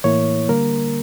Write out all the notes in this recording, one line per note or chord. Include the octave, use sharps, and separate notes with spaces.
A2 E3 A#3 E4 C#5
D3 G3 A#3 A#4